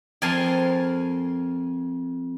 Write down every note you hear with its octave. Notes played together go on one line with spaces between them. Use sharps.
F2 A#4 G#5 A5 C6